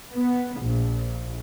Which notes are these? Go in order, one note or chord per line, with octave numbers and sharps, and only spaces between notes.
B3
A#1